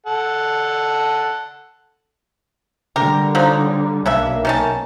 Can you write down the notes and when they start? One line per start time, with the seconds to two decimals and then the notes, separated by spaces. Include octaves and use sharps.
0.06 A4 F#5
2.96 D3 G3 G4 A#4
3.35 F3 F#3 D#4
4.06 B1 C#3 A#3 D4 E5
4.45 D#3 C#4 A5